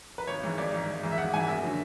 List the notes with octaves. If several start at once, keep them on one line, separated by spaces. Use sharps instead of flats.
B4
G#1 C#5
G#2 E3
G#1 D5
G#2 E3
G#1
G#2 E3
E5
G#1 F#5
G#2 E3 G#5
F#1 E5
D3 F#3